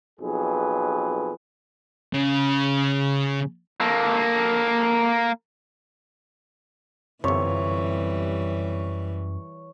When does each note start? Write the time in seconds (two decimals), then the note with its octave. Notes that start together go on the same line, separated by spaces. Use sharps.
0.20 B1 F2 G#4 B4
2.14 C#3
3.81 A#3 A4
7.24 G1 F#2 C3 E3 G3 C#5